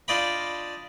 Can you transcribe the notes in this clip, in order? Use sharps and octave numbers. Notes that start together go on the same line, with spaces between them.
D4 F4 D5 D#5 G5 B5